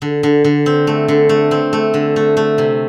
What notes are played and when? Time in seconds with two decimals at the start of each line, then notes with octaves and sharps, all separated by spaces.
0.02 D3
0.23 D3
0.44 D3
0.66 C4
0.87 A3
1.08 D3
1.29 A3
1.51 C4
1.73 A3
1.94 D3
2.16 A3
2.37 A3
2.58 C3